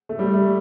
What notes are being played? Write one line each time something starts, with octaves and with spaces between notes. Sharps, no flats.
A3
G3
A3